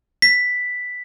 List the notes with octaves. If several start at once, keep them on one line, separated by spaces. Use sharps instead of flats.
B6